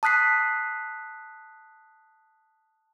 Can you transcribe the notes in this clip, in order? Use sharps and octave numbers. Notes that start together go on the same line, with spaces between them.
A5 D#6 F#6 B6 C7